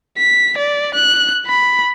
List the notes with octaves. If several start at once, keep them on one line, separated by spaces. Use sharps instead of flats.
B6
D5
F#6
B5